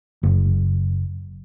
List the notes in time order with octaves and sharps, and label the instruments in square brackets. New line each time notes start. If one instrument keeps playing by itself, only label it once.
[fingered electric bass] F#1